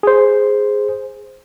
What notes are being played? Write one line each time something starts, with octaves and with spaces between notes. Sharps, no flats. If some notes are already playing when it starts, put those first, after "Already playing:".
G#4 C5